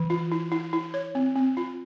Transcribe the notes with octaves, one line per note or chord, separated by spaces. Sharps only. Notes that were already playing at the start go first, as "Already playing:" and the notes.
Already playing: E3
F4
E4
E4
E4
C#5
C4
C4
F4